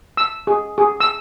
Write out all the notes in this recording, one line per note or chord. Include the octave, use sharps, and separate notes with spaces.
E6
G#4
G#4
E6